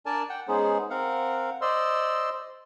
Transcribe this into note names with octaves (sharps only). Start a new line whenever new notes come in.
D4 A#4 D5 G#5 A5
F#5 G5
G#3 B3 C#4 D#4 G#4 C5
C4 A#4 F5 F#5
C5 D5 D#5 C6 E6